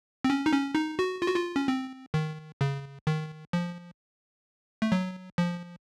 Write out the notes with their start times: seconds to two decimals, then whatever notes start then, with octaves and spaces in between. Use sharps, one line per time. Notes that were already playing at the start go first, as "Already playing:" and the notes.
0.24 C4
0.30 C#4
0.46 D#4
0.53 C#4
0.75 D#4
0.99 F#4
1.22 F4
1.28 F#4
1.36 F4
1.56 C#4
1.68 C4
2.14 D#3
2.61 C#3
3.07 D#3
3.53 F3
4.82 A3
4.92 F#3
5.38 F3